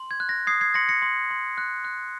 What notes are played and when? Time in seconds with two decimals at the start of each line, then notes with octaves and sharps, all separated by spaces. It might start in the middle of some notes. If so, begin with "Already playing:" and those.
Already playing: C6
0.11 G#6
0.20 F#6
0.29 A#6
0.47 D#6 G#6 C7
0.61 G#6 C7
0.74 C6 A#6 C#7
0.89 A#6 C#7
1.02 C6
1.31 C6
1.58 F#6
1.85 F#6